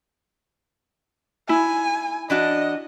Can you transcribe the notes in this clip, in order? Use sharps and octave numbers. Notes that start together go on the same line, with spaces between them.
E4 G#5
E3 D4 F#4 D#5